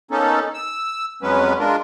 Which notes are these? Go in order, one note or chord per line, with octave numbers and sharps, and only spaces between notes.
A#3 B3 C#4 D#4 A4
E6
F2 F#3 G#3 B3 C#4 B4
G#3 D4 F4 A#4